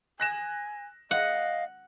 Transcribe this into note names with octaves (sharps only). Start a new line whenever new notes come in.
G#5 F#6 A#6 E7
D#5 F5 F#5